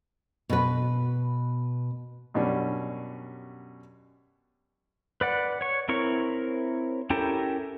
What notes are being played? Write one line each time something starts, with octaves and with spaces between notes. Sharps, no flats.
B2 B4
F#2 B2 G3 C#4 D4
B4 D5 F#5
C#5 C#6
C4 E4 A#4 C#5 C#6
C#4 E4 G4 A4 A#4